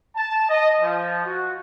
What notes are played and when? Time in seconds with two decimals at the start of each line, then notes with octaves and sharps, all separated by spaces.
0.16 A5
0.49 D#5
0.81 F3
1.25 F#4